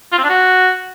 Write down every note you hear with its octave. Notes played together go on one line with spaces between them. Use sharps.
F4
C4
D4
F#4